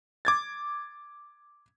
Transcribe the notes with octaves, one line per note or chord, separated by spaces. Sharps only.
D6 G#6 A6